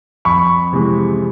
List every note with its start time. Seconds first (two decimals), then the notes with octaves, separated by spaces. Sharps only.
0.25 F2 B5 C#6
0.73 C3 E3 G#3